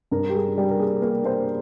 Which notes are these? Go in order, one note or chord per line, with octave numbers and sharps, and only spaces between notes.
G2 A#4
G4
G3 G#4
G3 G4
A#4
A#3 G#4
A#3 G#4
A#3 C5